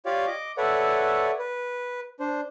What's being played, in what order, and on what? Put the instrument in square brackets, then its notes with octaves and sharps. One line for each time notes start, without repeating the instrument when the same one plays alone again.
[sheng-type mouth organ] F4 G4 C#5 D5 F5
D#5 D6
A4 B4 C#5 D5 E5 F#5
B4
D4 C5